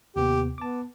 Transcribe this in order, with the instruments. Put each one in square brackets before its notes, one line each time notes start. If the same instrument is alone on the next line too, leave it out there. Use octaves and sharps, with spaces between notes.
[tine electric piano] D#2 C3 B3 [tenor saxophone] G4
[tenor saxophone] B3 [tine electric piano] A5 D6